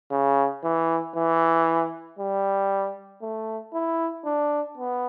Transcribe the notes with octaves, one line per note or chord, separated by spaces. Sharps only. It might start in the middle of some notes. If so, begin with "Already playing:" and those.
C#3
E3
E3
G3
A3
E4
D4
B3